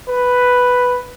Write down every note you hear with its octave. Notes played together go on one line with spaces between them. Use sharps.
B4